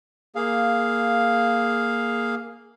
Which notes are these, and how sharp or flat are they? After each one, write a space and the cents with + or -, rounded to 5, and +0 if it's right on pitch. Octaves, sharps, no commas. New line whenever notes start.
A#3 +0 G#4 +0 F5 +0